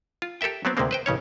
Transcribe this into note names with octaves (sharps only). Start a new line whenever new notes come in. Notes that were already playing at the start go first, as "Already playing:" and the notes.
F4
G4 A4 A#4 E5 G5
F#3 B3 C4
D2 C3 D#3 G#3 A#3 C4
B4 C5 G5
A1 C#3 C#4 C#5